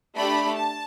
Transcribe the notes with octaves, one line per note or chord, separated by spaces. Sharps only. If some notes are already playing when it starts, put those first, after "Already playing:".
A3 D4 G4 B5
A5